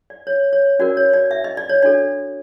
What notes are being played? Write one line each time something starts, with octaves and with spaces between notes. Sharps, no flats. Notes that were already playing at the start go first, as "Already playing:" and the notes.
D5
C#5
C#5
C#4 F#4 A#4 D5
C#5
D5
E5
D#5
D5
C#5
D4 F#4 A4 D5